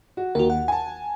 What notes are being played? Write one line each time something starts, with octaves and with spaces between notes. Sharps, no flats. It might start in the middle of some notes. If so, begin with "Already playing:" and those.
F#4
D#2 F#4 A#4
F#5
G#5 A5